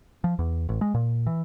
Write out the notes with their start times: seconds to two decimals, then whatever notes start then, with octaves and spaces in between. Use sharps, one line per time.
0.24 F3
0.39 E2
0.69 A1
0.81 G#3
0.94 A#2
1.27 E3